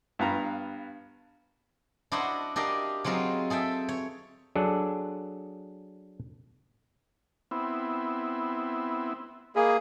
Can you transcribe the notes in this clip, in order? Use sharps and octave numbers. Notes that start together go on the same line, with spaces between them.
G2 B3 F5 A#5
D4 E4 F#4 C5 D#5 F#5
D4 G4 A#4 D#5 F5
F#3 G#3 C4 D#4 F4
G#4 A4 E5 G5
C#5
F#3 D4 G#4 A4 D5
B3 C4 E4
A#3 G#4 D#5 B5